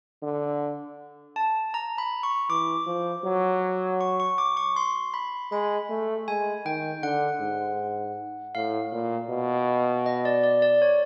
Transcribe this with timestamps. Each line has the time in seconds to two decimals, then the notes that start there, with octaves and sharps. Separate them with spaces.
0.22 D3
1.36 A5
1.74 A#5
1.98 B5
2.23 C#6
2.50 E3 D6
2.86 F3
3.25 F#3
4.01 C#6
4.20 C#6
4.38 D6
4.57 C#6
4.76 C6
5.14 B5
5.51 G#3 B5
5.89 A3
6.28 G#3 G#5
6.65 D#3 G5
7.03 D3 F#5
7.40 G#2
8.55 A2 F5
8.92 A#2
9.30 B2
10.06 D#5
10.25 D5
10.44 D5
10.62 D5
10.82 C#5